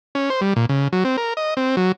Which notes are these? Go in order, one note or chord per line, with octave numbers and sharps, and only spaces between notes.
C#4
C5
G3
A#2
C#3
F#3
C4
A#4
D#5
C4
F#3